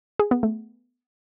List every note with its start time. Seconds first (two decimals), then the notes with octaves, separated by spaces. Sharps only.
0.19 G#4
0.31 B3
0.43 A3